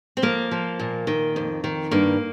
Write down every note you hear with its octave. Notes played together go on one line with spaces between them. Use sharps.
C4
F3 A#3
F3
A#2
D#3
F2
D#3
G2 A#3